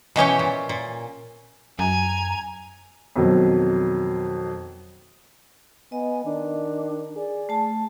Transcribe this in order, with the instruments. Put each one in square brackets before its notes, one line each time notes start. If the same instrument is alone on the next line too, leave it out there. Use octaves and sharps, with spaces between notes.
[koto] B2 E3 C#4 G4
A#2
A#2
[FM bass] F#2 [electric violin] G#5 [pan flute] A#5
[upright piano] F2 B2 D#3 F#3
[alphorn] B3 [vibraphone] D#5 [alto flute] G#5
[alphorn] D#3 [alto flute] D4
[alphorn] G#4 [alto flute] D5
[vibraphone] A3 A5